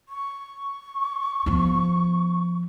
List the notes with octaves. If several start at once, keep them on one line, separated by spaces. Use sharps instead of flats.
C#6
F3 B3